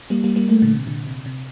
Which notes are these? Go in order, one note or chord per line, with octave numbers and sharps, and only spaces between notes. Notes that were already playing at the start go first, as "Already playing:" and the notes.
G3 A#3
G3 A#3
G3 A#3
G3 A3 A#3
A#2 D3
C3
A#2 D3
C3
C3